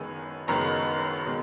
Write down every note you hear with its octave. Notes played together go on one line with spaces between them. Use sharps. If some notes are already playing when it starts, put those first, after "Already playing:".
Already playing: F#1 F#2 D#3 G#3 B3 G#5
F#1 F#2 D#3 G#3 B3 A#5
B2 G#3